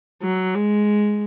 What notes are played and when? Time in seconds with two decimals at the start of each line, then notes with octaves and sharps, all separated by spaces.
0.22 F#3
0.55 G#3